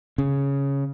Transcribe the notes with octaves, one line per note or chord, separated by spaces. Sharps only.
C#3